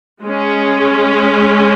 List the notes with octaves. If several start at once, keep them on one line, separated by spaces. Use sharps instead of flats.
G#3 C#4